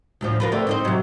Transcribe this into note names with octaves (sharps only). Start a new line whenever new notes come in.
D2 A2 F3
F4 A#4 B4
D3 A3 C4
C4 D#4 C5
C3 F#3